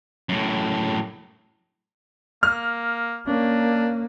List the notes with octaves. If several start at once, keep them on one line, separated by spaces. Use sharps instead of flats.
F#2 A2
A#3 F6
A#3 C#4 D4